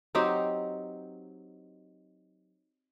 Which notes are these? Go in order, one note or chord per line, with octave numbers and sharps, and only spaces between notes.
F#3 C4 D#4 G4